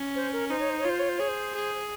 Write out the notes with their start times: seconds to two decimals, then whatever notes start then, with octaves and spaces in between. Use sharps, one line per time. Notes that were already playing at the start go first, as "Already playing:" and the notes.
Already playing: C#4
0.15 C5
0.33 A#4
0.50 D#4 C5
0.60 C#5
0.70 C5
0.80 C#5
0.85 F4 C5
0.99 C#5
1.09 C5
1.18 G#4 C#5
1.28 C5
1.55 G#4